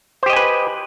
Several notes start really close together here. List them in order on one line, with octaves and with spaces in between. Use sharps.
C5 G4 D#5 G#5 B4